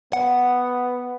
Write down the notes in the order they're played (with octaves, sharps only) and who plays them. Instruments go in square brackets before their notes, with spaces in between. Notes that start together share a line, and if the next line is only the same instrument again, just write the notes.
[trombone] B3 [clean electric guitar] F#5